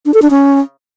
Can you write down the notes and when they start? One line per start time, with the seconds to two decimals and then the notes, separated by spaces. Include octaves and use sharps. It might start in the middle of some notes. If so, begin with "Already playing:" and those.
0.06 D4
0.14 A4
0.22 D4
0.30 C#4